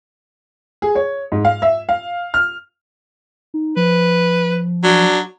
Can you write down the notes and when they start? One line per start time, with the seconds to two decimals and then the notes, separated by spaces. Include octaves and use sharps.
0.82 G#4
0.95 C#5
1.32 G#2
1.45 F5
1.62 E5
1.89 F5
2.34 F6
3.54 D#4
3.77 F3 B4
4.84 F#3 D4